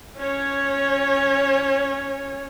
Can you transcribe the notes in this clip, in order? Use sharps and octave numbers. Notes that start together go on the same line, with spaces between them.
C#4 C#5